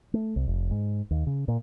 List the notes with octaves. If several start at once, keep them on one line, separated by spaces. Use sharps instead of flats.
A3
C2
F1
G#2
D#2
C#3
A#2